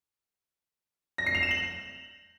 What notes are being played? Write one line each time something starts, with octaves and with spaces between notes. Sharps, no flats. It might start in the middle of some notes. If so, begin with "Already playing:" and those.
A#6
C7
F7
E7
F#7